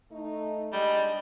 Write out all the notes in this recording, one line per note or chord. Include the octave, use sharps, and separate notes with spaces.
A3 D#4
G3 G#3 D4 D#5